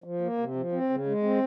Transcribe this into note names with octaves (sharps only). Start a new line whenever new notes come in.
F3
A#3
C3
F3
C4
C#3
G#3
C4